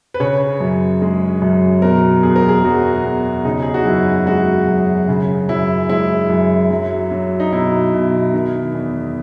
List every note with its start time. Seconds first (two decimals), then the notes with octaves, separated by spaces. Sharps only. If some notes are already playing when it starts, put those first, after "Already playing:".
0.14 B4
0.20 C#3 C#5
0.60 F#2
1.02 G#3
1.42 F#2
1.82 B2 A#4
2.23 E2 G#4
2.36 A#4
2.49 G#4
2.64 F#3 F#4
3.04 E2
3.45 C#3 D#4
3.62 G#4
3.74 F#4
3.85 F#2 E4
4.26 G#3 F#4
4.67 F#2
5.08 C#3
5.49 F#2 E4
5.89 G#3 E4
6.30 F#2
6.71 F#3
7.11 F#3
7.40 D#4
7.52 B2 E4
7.93 B2
8.34 D#3
8.74 E2